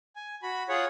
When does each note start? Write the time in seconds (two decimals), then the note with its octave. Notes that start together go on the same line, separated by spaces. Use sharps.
0.16 G#5
0.43 F#4 B5
0.69 F4 G#4 C#5 F#5